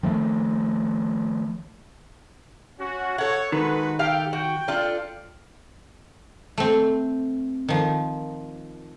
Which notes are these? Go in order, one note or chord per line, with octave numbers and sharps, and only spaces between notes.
D#3 F3 A3
C#4 F#4
A4 C#5 F#5
D#3 G#3 F#4 B4
G4 A4 F5 G5
F#4 G5
D4 F4 A4
A3 C4
D#3 F3